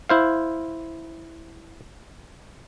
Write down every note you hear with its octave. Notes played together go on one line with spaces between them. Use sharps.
E4 C5 F5